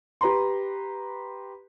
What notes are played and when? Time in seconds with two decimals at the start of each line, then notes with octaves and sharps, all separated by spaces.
0.21 G4 B4 A#5 C6